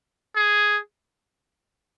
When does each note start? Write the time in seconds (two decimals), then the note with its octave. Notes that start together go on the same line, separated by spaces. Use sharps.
0.36 G#4